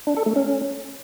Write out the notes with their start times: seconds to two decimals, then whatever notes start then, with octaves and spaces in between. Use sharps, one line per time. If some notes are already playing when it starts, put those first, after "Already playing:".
0.07 D4
0.17 A4
0.26 A3
0.36 C#4